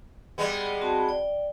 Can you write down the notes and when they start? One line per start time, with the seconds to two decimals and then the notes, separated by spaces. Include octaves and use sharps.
0.38 G3 G#3 B3
0.81 C4 F#4 A5
1.09 D5 G5